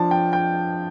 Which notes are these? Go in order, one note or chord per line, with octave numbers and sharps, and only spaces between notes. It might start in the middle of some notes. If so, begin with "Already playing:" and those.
Already playing: F3 D4 A5
G5
G5